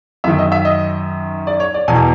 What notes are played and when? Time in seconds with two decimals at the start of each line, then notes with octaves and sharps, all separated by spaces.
0.24 F#2 D#3 E5
0.38 D#5
0.52 E5
0.65 D#5
1.47 D5
1.60 C#5
1.74 D5
1.88 E2 B2 G#5